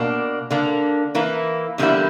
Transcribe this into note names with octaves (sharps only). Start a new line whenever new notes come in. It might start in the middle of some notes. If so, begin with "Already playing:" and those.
Already playing: B2 A#3 D4
D3 A#3 D4
E3 A#3 E4
E2 D3 G3 A#3 E4